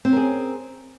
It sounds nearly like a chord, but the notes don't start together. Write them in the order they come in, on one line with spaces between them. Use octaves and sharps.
C4 C#4 A#4 G#4